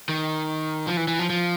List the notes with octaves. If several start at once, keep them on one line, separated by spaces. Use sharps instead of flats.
D#3
F3
E3
E3
F3
F3